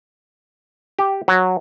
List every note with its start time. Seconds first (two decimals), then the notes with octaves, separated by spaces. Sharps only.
0.99 G4
1.28 F#3